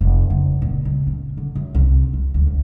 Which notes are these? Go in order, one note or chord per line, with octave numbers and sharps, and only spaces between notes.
F1
F#1
A#2
C#2
C#4
D3
F#2
C2
F2
D2
F#2